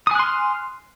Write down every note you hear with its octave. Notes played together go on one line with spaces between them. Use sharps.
G#5 C6 D#6 F6 F#6